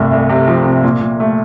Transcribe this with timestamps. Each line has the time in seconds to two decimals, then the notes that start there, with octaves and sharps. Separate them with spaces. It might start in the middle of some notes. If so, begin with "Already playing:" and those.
Already playing: G1 C2 A3
0.11 C2
0.29 C3
0.48 F3
0.66 C3
0.84 A#2
1.01 A#2
1.20 A3